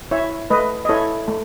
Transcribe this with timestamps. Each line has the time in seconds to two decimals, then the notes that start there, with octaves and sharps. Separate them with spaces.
0.11 E4 C#5 E5
0.50 A3 B4 D#5
0.85 D#5
0.89 E4 A4 C#5
1.28 A3